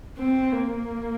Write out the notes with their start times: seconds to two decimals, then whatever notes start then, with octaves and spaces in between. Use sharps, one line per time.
0.19 C4
0.52 A#3